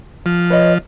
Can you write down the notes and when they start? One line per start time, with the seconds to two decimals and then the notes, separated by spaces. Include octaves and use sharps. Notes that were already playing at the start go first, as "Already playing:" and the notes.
0.26 F3
0.50 B4 C#5 D#5